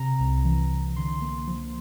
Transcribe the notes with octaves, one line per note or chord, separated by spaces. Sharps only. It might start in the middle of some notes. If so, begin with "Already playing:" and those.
Already playing: C3 A#5
C2
E3
C2
D3 C6
A#3
F3